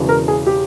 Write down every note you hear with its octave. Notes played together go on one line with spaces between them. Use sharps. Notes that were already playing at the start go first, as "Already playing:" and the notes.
Already playing: E1 E2 C#3 E3
A#4
G#4
G4